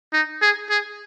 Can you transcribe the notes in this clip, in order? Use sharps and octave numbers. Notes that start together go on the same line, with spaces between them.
D#4
G#4
G#4